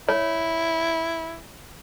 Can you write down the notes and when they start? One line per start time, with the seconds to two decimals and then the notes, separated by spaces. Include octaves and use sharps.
0.09 E4 C#5